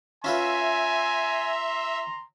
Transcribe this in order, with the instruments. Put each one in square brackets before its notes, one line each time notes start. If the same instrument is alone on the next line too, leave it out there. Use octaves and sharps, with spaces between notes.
[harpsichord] C#4 F4 B4 [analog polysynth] E5 [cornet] G#5 [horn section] A#5 C6